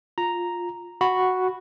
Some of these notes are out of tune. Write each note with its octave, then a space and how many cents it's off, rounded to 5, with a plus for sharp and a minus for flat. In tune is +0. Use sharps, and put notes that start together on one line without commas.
F4 +10 A#5 +0
F#4 +0 B5 +0